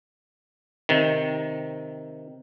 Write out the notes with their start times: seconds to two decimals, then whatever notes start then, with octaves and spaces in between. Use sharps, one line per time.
0.89 C3 D#3